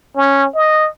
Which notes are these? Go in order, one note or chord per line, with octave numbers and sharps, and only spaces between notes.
C#4
D#5